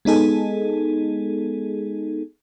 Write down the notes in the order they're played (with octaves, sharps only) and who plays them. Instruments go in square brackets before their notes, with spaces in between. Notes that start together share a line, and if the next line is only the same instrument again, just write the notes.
[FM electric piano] G#3 B3 D#4 G#4 A4